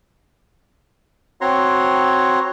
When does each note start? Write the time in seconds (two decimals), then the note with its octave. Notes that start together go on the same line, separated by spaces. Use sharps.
1.41 C4 F#4 C#5 A#5 C6